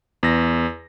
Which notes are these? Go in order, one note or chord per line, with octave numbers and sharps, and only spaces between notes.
E2 A#6